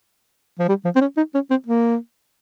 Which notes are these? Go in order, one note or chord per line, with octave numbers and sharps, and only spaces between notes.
F3
G3
F3
C4
C#4
D#4
C#4
C4
A#3